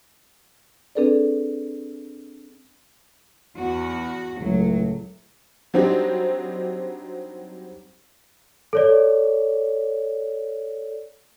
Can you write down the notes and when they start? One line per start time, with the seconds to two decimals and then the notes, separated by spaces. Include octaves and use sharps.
0.95 C4 D4 G#4 A4 B4 D5
3.57 E2 F#4
4.41 C#2 A2 F#3
5.74 F#3 G3 C4 D4 D#4 G4
8.73 A4 C#5 D5